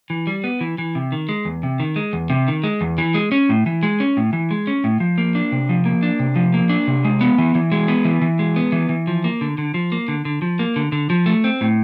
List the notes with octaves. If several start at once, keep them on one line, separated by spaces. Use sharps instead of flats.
E3
G3
B3
E3
E3
C3
D#3
G#3
E2
C3
D#3
G#3
E2
C3
D#3
G#3
E2
E3
G#3
C#4
A2
E3
G#3
C#4
A2
E3
G#3
C#4
A2
F3
A#3
D4
C3
F3
A#3
D4
C3
F3
A#3
D4
C3
G#3
B3
E3
E3
G#3
B3
E3
E3
G#3
B3
E3
E3
F3
A#3
D3
D3
F3
A#3
D3
D3
F3
A#3
D3
D3
F3
A3
C4
A2